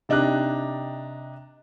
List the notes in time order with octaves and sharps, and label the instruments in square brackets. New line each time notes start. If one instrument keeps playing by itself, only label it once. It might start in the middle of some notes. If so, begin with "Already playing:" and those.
[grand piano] C3 D4 D#4 G4 F#6